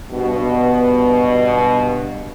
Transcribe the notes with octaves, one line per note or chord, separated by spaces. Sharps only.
G2 B2